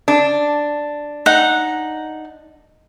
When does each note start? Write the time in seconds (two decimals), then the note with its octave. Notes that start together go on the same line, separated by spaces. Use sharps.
0.08 D4
1.26 D#4 F#5